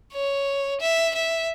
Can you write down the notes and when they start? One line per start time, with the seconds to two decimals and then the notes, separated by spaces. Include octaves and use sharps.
0.12 C#5
0.81 E5
1.15 E5